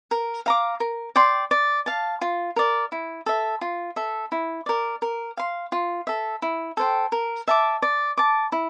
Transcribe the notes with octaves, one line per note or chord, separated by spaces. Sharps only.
A#4
F5 A#5 D6
A#4
D5 G5 C6
D5
F5 A5
F4
A#4 D5
E4
A4 E5
F4
A4 E5
E4
A#4 D5
A#4
F5 C6
F4
A4 E5
E4
A4 C5 G5
A#4
E5 A5 D6
D5
A5 D6
E4